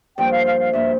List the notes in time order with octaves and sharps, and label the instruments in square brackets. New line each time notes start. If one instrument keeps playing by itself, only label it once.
[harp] G2 F3 A#3 [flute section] G5
[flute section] F5
F5
F5
[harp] G2 F3 A#3 [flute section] E5